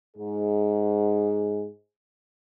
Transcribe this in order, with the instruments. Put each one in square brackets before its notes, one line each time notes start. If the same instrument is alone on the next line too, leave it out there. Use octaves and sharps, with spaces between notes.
[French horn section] G#2 G#4